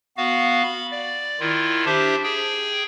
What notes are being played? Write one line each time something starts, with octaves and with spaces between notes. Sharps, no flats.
B3 F#4 F5
B5
D5
D#3 E4 F4
D4 G4 C5 E5
G#4 G5